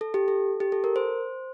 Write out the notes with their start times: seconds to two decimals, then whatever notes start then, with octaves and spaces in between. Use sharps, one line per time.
0.01 A4
0.14 G4
0.28 A4
0.60 G4
0.72 A4
0.84 A#4
0.96 C5